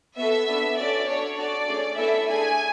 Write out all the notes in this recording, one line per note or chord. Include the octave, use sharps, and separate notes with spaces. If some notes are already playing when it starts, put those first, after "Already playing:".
B3 F#4 A4 E5
B3 D4 A4
C#4 F#4 A4 D5
D4 A4 C#5
D4 F#4 A4 D5
A3 C#4 G#4
B3 E4 A4 E5
A3 D4 G#4 G#5